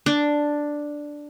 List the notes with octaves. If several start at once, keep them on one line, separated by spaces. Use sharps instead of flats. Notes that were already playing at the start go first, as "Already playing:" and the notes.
D4